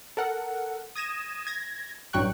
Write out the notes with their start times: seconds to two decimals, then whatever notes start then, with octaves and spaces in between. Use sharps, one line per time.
0.17 A4 A#4 F#5
0.95 D#6 G#6 A#6 D#7 E7
1.47 G#6 A#6
2.13 A1 G2 F#3 G5 C#6 F#6